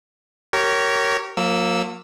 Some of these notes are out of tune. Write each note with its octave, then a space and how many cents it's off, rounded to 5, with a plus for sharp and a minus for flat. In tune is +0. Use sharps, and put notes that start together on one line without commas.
G4 -30 A#4 -10 C#5 +0
F#3 -45 A#3 -5 E6 -5